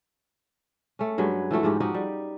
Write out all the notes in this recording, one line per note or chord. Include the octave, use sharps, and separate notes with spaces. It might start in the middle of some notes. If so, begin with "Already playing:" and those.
A3 C#4
G2 F#3 G#3 B4
E3 F3 A3 F#4
G#2 F3 F#4 G4
F3 D#4 F#4 G4
G3